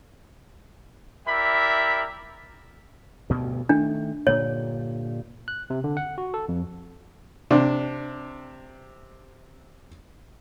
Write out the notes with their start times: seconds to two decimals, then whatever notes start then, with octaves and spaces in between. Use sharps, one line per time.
1.27 E4 G4 A#4 D5 E5 B5
3.30 D2 G2 B2
3.69 D#3 A3 D4
4.27 G2 A#2 D3 C#5
5.48 F#6
5.70 C3
5.84 D3
5.97 F#5
6.18 F#4
6.34 A4
6.49 F2
7.51 C3 D4